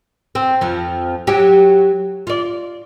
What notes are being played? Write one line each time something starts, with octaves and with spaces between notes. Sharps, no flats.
C4
F2 F3
F#3 G4
F4 D5